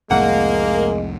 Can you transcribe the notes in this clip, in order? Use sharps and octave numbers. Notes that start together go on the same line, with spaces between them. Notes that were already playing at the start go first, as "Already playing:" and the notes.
C2 F2 A2 G#3 A#3 F#5